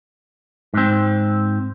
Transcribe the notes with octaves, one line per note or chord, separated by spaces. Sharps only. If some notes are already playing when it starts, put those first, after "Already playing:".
G#2 C4